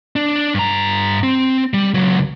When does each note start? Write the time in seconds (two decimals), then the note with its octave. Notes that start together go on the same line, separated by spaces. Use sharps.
0.16 D4
0.55 G2 A#5
1.23 C4
1.74 G3
1.94 C#2 F#3